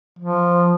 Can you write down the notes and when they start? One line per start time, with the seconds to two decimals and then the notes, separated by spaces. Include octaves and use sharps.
0.19 F3